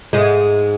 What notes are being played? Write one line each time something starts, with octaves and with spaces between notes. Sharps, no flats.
G#2 G#3